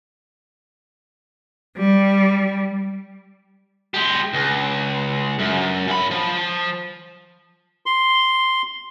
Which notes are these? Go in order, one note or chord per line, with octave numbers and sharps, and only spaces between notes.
G3
G#3 G4
C#2
F#2
F#2 B5
F3
C6